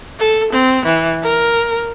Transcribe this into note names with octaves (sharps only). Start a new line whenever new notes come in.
A4
C4
E3
A#4